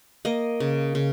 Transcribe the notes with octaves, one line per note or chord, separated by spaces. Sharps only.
A#3 D#5
C#3
C#3